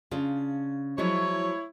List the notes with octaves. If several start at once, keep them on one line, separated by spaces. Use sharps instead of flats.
C#3 D4 F4
F3 F#3 G#3 E4 C#5